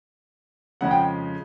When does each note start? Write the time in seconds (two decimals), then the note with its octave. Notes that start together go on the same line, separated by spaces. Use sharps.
0.81 F2 C#3 F3 G#3 F#5
0.91 G5